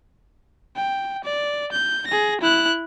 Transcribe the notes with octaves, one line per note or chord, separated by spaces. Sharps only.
G5
D5
G6
G#4 A#6
E4 F#6